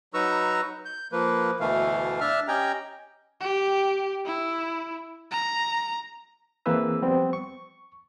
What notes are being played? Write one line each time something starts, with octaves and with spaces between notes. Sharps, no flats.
F#3 D#4 B4 A#5 C#6 E6
G6
F3 A#3 B4
D2 B2 E3 A3 F5
D4 E5 A5 F6
C#4 G4 D#5 G5 G#5 A#5
G4
E4
A#5
E3 A#3 C4 G#4 B4 E6
F3 G3 B3 C4
C#6